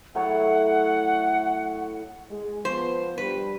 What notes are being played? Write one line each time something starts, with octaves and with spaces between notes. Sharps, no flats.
A2 F#3 C#5 F#5
G#3
F3 B3 C5
G2 G3 B4